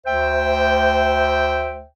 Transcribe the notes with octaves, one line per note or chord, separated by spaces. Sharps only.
D2 C5 E5 G5